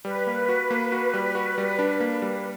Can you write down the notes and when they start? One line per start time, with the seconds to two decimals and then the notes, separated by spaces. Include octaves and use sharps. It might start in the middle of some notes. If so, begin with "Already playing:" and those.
0.05 G3 B4
0.27 A#3
0.49 F#4
0.71 A#3
0.92 F#4
1.14 G3
1.35 F#4
1.58 G3
1.79 D4
2.00 A#3
2.22 G3